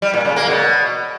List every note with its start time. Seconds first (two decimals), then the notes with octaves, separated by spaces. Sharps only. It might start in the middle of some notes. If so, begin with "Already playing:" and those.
0.02 G3
0.14 A#2
0.25 C#3
0.36 A#3
0.48 B2